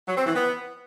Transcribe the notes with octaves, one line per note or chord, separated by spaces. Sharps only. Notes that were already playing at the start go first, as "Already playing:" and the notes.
F#3
C4
E3
B3